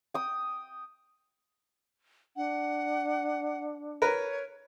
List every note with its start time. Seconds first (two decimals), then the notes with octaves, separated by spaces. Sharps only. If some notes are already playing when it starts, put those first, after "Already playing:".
0.14 G5 D#6
2.36 D4 F#5
4.02 A#4 B4 C#5